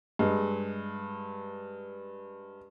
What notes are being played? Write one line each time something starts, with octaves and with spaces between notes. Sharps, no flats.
G2 G#3